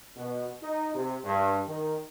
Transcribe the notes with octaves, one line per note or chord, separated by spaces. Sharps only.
B2
D#4
C3
G2
D#3